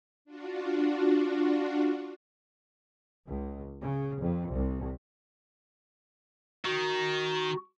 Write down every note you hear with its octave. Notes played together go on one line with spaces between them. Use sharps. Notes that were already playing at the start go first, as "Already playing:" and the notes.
D4 F4 F#4
C#2
C#3
F2
C2
D#3 F#4